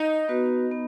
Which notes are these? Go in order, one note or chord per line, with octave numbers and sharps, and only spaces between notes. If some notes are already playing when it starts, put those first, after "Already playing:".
Already playing: D#4
B3 F#4 B4
B3